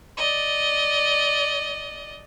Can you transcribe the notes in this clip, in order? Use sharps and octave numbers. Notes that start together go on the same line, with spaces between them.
D5 D#5